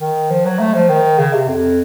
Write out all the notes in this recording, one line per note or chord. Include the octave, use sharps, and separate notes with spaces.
D#3
F3
F#3
A3
F3
D#3
C#3
C3
F2